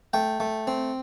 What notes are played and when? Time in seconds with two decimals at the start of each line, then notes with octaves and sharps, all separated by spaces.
0.13 A3 G5
0.40 A3
0.67 C4